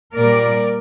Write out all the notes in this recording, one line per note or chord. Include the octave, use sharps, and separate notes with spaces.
A#2 G3 A#4 D5